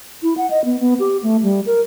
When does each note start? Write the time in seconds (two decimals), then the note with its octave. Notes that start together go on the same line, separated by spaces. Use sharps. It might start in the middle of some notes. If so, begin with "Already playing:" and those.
0.23 E4
0.38 F#5
0.51 D#5
0.65 B3
0.80 B3
1.00 G4
1.23 A3
1.43 G3
1.66 A#4